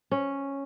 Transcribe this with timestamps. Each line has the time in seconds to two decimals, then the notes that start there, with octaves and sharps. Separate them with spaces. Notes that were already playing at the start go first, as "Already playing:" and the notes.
0.11 C#4